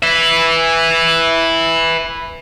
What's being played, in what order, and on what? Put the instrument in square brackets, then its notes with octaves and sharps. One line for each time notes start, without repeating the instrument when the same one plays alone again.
[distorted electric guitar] B4 E5